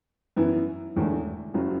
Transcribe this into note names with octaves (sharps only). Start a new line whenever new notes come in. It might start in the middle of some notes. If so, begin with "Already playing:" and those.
F#2 E3 B3 E4
E1 E2 D3 A3 E4
F#1 F#2 F#3